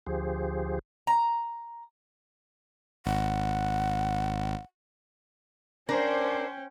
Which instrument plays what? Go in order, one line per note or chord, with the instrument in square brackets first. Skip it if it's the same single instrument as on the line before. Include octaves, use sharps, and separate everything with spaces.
[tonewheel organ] D2 F3 G4 G#4 C5
[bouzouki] A#5
[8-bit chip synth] G#1 [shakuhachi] F#5
[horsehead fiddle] C#4 G5 [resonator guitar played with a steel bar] D4 A#4 [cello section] C5